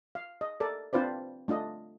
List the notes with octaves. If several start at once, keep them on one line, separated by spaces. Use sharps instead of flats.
F5
D#5
A4 A#4 D5
C4 D4 F4 B4 C5 D5
A3 D4 F4 D#5